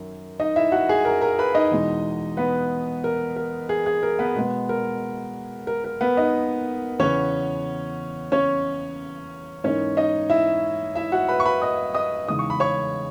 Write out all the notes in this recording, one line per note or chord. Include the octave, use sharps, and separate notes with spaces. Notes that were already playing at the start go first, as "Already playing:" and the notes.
Already playing: F#2 D#3
D#4 D#5
E4 E5
F#4 F#5
G#4 G#5
A#4 A#5
A#4 A#5
B4 B5
D#4 D#5
E2 B2 G#3
B3 B4
A#4
A#4
G#4
G#4
A#4
B3 B4
B2 G#3 B3
A#4
A#4
A#4
B3 B4
D#4 D#5
E2 C#3 E3 B3 C#4 C#5
C#4 C#5
G#2 E3 A#3 C#4 D#4 C#5
D#4 D#5
E4 E5
E4 E5
F#4 F#5
B4 B5
C#6
B4 B5
D#5 D#6
D#5 D#6
E2 C#3 G#3 D#4 D#6
C#6
B5
C#5 C#6